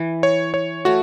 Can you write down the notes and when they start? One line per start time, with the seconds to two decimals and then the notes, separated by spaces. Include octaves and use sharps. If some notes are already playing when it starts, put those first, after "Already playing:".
Already playing: E3
0.23 C#5
0.54 C#5
0.85 A3 F#4